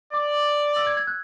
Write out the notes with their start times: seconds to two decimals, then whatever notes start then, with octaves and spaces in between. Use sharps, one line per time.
0.13 D5 D6
0.76 E6
0.87 G#6
0.97 G#6
1.07 F#6